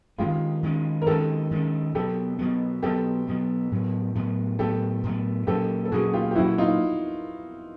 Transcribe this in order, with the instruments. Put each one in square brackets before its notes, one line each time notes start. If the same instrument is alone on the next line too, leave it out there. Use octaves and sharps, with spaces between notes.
[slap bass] D#3 G#3 C#4 [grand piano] F4 G4
[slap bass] D#3 G#3 C#4
[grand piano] A#4
[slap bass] D#3 G#3 C#4 [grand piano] G4 A4
[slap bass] D#3 G#3 C#4
[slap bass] B2 F#3 B3 [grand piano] G4 A4
[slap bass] B2 F#3 B3
[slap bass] B2 F#3 B3 [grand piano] G4 A4
[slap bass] B2 F#3 B3
A2 F#3 B3
A2 F#3 B3
[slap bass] A2 F#3 B3 [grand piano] G4 A4
[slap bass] A2 F#3 B3
[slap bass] A#2 F#3 A#3 C#4 [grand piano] G4 A4
[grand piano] A4
[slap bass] A#2 F#3 A#3 C#4 [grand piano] F#4 G#4
[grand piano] F4 G4
G4
[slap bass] A#2 F#3 A#3 C#4 [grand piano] E4 F#4
[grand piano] D#4 F4